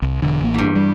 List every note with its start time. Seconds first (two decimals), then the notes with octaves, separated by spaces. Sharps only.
0.02 C2
0.22 E1 D3
0.40 A1 A#3
0.54 E2 G2
0.75 G3